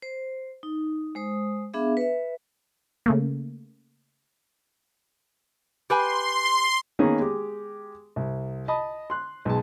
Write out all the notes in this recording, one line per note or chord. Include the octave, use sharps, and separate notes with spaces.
C5
D#4
G#3 C5 D#6
B3 D4 G#4 E5 F5
B4 E5
C#3 A3 A#3
G4 B4 G#5 C6
D#3 A#3 B3 C#4 D#4 G#4
G#3 G4
C2
D#5 A5 B5 D#6
C6 F#6
B1 G#3 A5